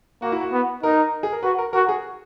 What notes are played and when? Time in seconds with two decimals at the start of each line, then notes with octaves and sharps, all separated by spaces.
0.22 A#3 F#4
0.32 E4
0.41 F#4
0.52 B3
0.83 D#4 A#4
1.23 G#4
1.32 A#4
1.43 F#4 B4
1.58 A#4
1.73 F#4 A#4
1.89 G#4